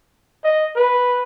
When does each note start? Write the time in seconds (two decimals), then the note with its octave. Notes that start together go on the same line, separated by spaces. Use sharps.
0.44 D#5
0.76 B4